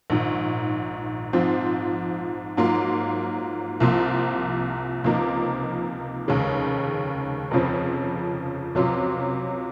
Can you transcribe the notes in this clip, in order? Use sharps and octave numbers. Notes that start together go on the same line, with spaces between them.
A#1 G#2 D#3
G#2 F3 C4 F4
G#2 F#3 A#3 F4
C2 C3 F3 A#3 F4
C#2 C3 F3 A#3 D#4
F1 D#2 C#3 G#3
F1 F2 C#3 F3 C4
C#2 C3 F#3 C#4 F4